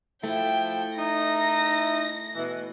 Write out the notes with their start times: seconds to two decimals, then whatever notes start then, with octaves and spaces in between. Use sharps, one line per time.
0.24 F3 A3 E4 G5
0.98 D#4 E4 A#6
2.35 B2 E3